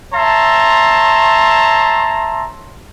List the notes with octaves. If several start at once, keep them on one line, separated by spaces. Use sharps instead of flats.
C#5 E5 A5 A#5 C6